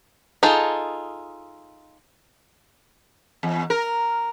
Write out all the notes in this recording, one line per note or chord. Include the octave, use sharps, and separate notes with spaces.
D#4 F4 G#4 A4
E2
A#4